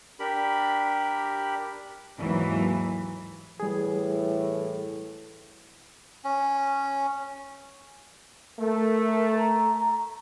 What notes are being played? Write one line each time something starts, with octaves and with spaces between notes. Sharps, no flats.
D4 G4 A#4 B5
D#2 G#2 E3 F#3
A2 E3 G3 G#4
C#4
A3 A#4
A#5